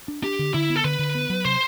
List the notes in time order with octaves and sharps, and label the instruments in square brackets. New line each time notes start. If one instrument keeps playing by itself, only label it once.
[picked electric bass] D4
[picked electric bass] D4 [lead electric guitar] G4
[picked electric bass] D3
[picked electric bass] D3 [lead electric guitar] E4
[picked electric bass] B3
[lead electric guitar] A4
[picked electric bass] D3 [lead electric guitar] B4
[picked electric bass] D3
B3
F#3
[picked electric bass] C3 [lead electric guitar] C5